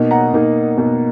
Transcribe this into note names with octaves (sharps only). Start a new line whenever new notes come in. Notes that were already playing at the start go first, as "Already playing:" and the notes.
Already playing: B2 A#3 D#4
F#5 A#5
B2 A#3 D#4
B2 A#3 D#4